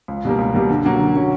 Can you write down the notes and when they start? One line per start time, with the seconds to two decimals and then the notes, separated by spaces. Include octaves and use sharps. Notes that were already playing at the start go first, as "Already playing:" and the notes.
0.08 C#2
0.25 B2 G3 A#3
0.39 C#2
0.54 B2 G3 A#3
0.70 D3
0.85 F#3 A#3 C#4 F#4
1.00 D3
1.15 F#3 A#3 C#4 F#4